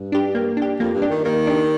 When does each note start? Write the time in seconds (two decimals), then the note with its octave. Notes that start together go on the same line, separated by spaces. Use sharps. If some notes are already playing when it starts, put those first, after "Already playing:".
Already playing: G2
0.12 D4 G4
0.35 A#3
0.57 D4 G4
0.80 F2 A#3
0.95 G2
1.02 D4 G4
1.10 D#3
1.25 D#3 A#3
1.47 D4 G4